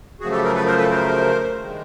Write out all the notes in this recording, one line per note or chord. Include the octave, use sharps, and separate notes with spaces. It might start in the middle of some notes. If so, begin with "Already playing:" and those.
F#2 C#3 F3 A3 F#4 G#4
G4 A4
G#4 A#4
A4 B4
A#4 C5
A4 B4
A#4 C5
G2 D#3 G#3